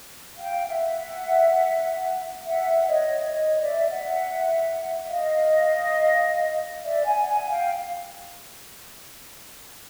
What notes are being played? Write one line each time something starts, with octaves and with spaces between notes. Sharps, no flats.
F5 G5
E5 F#5
E5 F#5
C#5 D#5
C#5 D#5
D5 E5
E5 F#5
D#5 F5
D5 E5
F#5 G#5
F#5 G#5
F5 G5